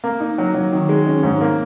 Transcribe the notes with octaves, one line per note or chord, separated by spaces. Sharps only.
A#3
D#4
F#3
F#3
D#3
G#3
C#4
G#2
A#3